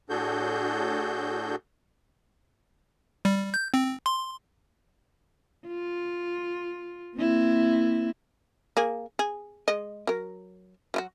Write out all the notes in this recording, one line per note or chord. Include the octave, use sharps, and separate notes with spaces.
A2 D4 F#4 G#4 A4 G6
G3
G6
C4
C6
F4
A#3 C4 E4
A#3 G#4
G#4
G#3 D#5
F#3 A#4
F#3 F4 F#4